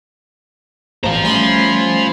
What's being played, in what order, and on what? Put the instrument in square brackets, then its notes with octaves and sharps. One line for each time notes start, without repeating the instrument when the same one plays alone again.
[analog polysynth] A1 [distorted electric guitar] C5 F5 [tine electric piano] A#5
[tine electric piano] G3 A3 C#4 [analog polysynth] G#5 B5 C6